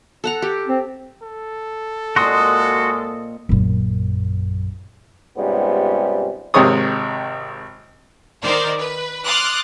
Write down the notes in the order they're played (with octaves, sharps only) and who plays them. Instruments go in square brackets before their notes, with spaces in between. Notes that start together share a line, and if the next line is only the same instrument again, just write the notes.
[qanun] A4 F#5 A#5
G4
[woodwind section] C4
[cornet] A4
[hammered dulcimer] A#2 C4 D#5 [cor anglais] G#3 [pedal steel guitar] F#4 C6 D#6
[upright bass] A#1 F#2
[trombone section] G#2 C3 G3 B3 C#4 F4
[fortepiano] G#1 C3 D#3 G#3 C#5 D#6
[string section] D#3 A#4 C5 D5
B4
C6 D6 D#6 F6 F#6 A6